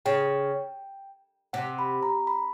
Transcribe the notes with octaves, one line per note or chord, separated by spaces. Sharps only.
C#3 G5
C3 F#5
B5
A#5
B5